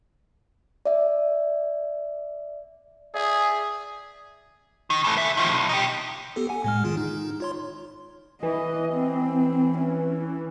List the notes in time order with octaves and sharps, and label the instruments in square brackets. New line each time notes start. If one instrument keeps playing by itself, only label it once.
[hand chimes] D5 E5
[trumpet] G#4 [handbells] D5 E5 D#6
[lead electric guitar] D#3
E3 A3
B2 E5
D#3 F3
B1
D#4 G4
[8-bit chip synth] B3 G4 A4
F#5 G#5
A2 G#3 F6
D#3 F4 G#4
D#4
F4 C#5 C6
[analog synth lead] E3 [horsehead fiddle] D#5
[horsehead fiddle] C4
C#4